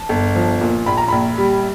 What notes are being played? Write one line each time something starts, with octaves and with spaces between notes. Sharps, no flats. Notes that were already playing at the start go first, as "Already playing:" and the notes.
Already playing: A5
G1
F3
A#2
A#1 B5
A#5
A#1 B5
G3